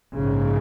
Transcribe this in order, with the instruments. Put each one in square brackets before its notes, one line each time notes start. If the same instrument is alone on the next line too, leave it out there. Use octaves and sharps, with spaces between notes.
[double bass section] A#1 G#2 C#3